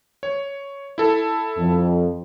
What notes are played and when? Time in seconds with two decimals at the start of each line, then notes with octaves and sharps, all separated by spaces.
0.23 C#5
0.98 E4 A4
1.58 F2